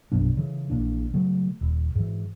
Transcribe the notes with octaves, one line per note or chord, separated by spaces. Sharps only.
A#1 F#2 B2 D4
C#3 E3
A#1 A#2 E3 D4
C#3 F#3 A3
D#1
G#2 E3